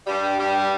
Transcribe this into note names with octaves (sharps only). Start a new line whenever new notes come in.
G2 G3
G2 G3